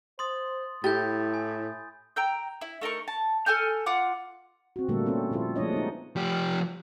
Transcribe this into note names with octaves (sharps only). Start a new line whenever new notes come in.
C5 C6 D#6 A6
A2 E4 G4 G6 A6
G#5
G5 A#5 E6 G6
E4
A3 D#4 A#4 C#6
A5
A4 G#5 F6 G6
F4 F#5 D6
C4 F#4
A#2 D3 G3 A3 A#3 A4
C4 C#4 F4 A4
A#2 F3 E4 F4 A4
F3 G#3 A3 D4 C#5 D#5
B3 D#4
F3 G4